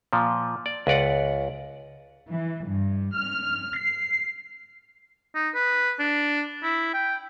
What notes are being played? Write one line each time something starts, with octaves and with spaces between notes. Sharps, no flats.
A#2 F3
D5
C#2 B4 D5 F#5
E3
G2
F6
C7
D#4
B4
D4
E4
G5